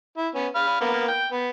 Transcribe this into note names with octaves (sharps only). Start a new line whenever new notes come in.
E4
B3 C#4
F5 B5
A#3 B3
G5
B3